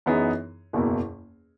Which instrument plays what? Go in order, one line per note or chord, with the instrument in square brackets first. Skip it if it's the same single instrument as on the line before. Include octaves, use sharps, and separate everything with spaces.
[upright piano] F#2 E3 B3 D#4 G#4
F#1 E2 B2 A#3 E4